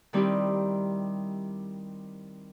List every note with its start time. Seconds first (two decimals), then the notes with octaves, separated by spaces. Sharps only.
0.13 D#3 G3 C4 D#4 E4 G4